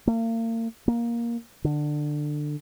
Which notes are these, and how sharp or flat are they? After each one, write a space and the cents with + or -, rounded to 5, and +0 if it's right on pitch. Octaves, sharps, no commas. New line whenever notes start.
A#3 -40
A#3 +10
D3 +20